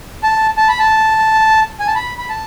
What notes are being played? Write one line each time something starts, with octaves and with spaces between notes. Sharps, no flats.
A5
A5
B5
A5
G#5
A5
B5
B5
A5